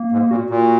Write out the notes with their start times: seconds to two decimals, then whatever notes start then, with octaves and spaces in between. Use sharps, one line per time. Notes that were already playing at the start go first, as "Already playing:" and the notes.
Already playing: A#3
0.12 G#2
0.30 A#2 F#4
0.50 A#2